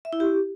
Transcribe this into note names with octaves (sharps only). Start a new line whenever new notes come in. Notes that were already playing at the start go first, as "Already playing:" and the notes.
E5
E4
G4